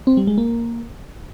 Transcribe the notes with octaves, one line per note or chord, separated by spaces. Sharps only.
C4
G3
G#3
A#3